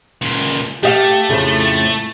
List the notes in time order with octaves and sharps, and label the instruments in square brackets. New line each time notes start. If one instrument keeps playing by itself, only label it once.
[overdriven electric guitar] C#2 A#2
[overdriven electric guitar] A3 [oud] G4 D#5 F5
[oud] F2 A2 C#3